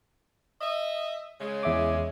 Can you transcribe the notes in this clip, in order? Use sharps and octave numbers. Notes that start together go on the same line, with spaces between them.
D#5 E5
C#3 G#3
E2 E5 D6